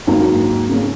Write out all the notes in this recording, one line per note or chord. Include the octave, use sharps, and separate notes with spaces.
G#2 D#3 F#3 A#3
C#3 A#3 C#4